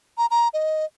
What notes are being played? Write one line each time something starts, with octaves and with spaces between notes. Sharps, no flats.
A#5
A#5
D#5